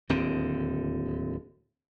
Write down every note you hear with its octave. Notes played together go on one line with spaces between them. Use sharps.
D1 D#2 D3 C4